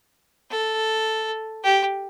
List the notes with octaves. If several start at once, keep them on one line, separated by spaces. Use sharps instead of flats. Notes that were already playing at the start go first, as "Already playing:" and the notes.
A4
G4